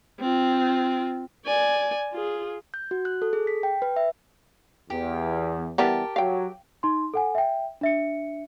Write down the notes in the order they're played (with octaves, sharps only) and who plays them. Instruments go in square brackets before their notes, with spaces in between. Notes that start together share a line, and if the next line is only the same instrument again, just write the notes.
[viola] C4 F4
D5 G#5
F4 G#4
[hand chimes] G6
F#4
F#6
A4
G#4
B6
G5
B4
E5
[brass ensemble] E2 [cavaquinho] G4
[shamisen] E3 G3 B3 [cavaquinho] G4 A#4 A5
[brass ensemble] F#3 [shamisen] F5 G5
[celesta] D#4 C6
A4 F#5 G#5
E5 G5
D4 E5 C#7